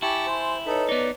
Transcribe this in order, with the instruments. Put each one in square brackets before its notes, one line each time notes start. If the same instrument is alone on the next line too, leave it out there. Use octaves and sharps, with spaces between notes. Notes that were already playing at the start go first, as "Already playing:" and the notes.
[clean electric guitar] E4 [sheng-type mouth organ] G4 A5 C#6 [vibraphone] G#5
[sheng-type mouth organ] C5 [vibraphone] G#5 C6
[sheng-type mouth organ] D#4 A4 [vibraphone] B4 C#5
[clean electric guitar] B3 D#4 [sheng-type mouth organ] D5